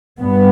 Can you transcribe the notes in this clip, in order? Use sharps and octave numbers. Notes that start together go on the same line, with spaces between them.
G2 B3